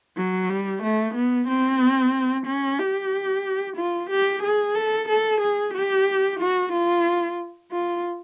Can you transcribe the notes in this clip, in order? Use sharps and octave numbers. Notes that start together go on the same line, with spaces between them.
F#3
G3
A3
B3
C4
C#4
G4
F4
G4
G#4
A4
A4
G#4
G4
F#4
F4
F4